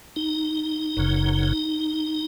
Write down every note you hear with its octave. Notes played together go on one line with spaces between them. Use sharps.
D#4
F#1 F#2 C#3